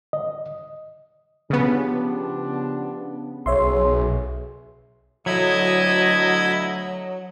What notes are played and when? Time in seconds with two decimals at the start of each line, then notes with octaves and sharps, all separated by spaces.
0.13 D#5
1.50 C#3 F3 B3 D4 G4
3.46 B1 G#4 C#5 E5 C6
5.26 D2 F#3 E4 D#5 B5 G#6